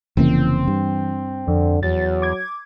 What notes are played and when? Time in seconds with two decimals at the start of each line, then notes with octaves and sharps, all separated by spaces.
0.17 F1 C#3 E3 A#3 C4
0.67 G2
1.48 F2 D3
1.83 E2 F#3 A6
2.22 D6 G#6